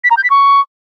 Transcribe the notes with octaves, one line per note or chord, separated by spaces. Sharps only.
B6
A#5
G6
B6
C#6